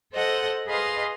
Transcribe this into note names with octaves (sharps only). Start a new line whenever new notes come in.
A4 C5 D#5 F#5
G#4 B4 D#5 F5 C6